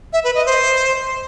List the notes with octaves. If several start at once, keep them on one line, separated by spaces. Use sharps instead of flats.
E5
B4
D#5
C5